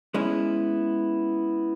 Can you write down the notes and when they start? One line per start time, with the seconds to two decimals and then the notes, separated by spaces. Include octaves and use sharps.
0.14 G#3 B3 C#4 E4